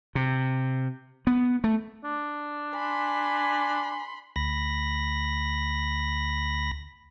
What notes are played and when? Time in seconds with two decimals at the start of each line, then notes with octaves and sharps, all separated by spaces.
0.15 C3
1.27 B3
1.64 A3
2.04 D4
2.75 G#5 B5 C6
4.36 D2 B5 A#6